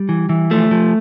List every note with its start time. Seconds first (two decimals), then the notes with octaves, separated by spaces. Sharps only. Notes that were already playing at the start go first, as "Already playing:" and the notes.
Already playing: G3
0.09 E3
0.29 E3
0.51 F3 A3
0.71 F3